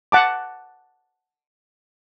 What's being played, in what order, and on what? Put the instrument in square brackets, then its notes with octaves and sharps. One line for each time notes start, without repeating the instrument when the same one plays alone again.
[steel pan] F#5 A5 D6